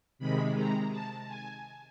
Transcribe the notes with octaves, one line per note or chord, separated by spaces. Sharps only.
C3 D#3 G#3 B5
A#5
A5
G#5